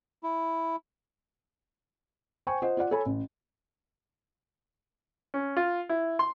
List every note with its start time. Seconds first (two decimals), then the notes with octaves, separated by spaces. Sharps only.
0.23 E4
2.47 C5 G5 G#5 C#6
2.62 F4 C5 D#5 F#5
2.77 F4 D5 F#5
2.91 A4 C#5 G#5 B5
3.06 A1
5.34 C#4
5.57 F4
5.89 E4
6.19 C6